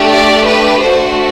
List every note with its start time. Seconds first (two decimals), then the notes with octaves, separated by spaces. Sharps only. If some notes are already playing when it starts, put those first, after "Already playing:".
Already playing: A3 D4 G4
0.11 D5
0.46 B4
0.82 A3 D4 F#4 A4 C5